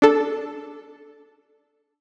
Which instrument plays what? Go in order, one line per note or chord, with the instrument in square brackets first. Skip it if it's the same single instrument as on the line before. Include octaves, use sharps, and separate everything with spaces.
[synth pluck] D4 A4